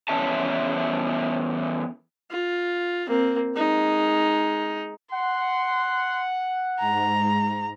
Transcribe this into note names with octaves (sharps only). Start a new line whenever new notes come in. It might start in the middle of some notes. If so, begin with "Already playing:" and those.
E2 C#4 E5 A5
F4
A#3 C4
G#3 D#4
F#5 C6
G#2 A#5